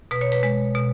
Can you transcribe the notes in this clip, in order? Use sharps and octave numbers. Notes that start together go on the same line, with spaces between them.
B2 B4
C#5
B4
G#3
B2